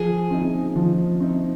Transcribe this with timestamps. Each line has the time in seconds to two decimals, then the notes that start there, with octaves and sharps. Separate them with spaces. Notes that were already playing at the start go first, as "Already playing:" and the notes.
Already playing: F3 G#4
0.30 C4 D#4
0.76 F3
1.20 C4 D#4